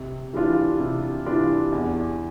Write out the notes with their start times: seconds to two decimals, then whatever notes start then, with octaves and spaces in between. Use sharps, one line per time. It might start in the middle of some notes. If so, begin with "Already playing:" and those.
Already playing: C3
0.33 E3 G3 D4 F4
0.80 C3
1.26 E3 G3 D4 F4
1.72 E2